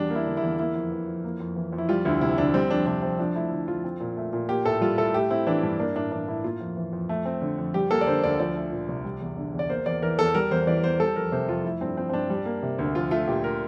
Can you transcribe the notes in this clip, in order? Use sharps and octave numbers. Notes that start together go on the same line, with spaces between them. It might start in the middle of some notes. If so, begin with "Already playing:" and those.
Already playing: E2 G3 D4
A#3
E4
D3
E2 E4
A#3 E4
F2
E3
F2
A#3
F2
E3
F2
E4
G3 F4
D2 E4
C3 E4
D2 D4
G3 C4
F2 D4
C3 D4
F2 C4
F3 D4
A3 E4
D3 E4
F2 F4
C4
A#2
A3
A#2
A#3 G4
A2 A4
G3 F4
A2 A4
A3 G4
C4 E4
E3 D4
G2
A#3 D4
A2 D4
E3 D4
A2 E4
A#3 F4
F2
E3
F2
A3
C4
D3
F2
G3 G4
A#3 A4
D5
D3 C5
D2 D5
F3 D5
A3
A#2
C2
G3
E2
D3
E2
D5
A#3 C5
E2 D5
E3 A#4
E2 A4
G3 A#4
E2 C5
E3 D5
E2 C5
G3 A4
F2 A#4
C3 C5
F2 F4
A3 E4
G2 C4
F3 C4
C4
G2 D4
G3
A#3
C3
D2
F3 F4
A3 F4
A#2 G4
A#4